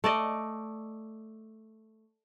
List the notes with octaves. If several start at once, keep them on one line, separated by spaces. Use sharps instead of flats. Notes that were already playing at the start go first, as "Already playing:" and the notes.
A3 D5 D#5